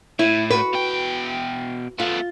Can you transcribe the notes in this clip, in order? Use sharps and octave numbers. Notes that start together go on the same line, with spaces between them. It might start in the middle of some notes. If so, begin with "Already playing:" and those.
A2 E4
F#4 B4
B2 G5
A3 B3 F4